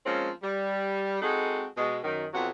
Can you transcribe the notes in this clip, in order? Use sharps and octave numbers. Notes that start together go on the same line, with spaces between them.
F3 G#3 A#3 C4 C#4
G3
G#3 C4 D#4 F#4 G#4 A4
B2 G#3
F#2 D#3
F2 C3 F#3 B3 F#4 F#5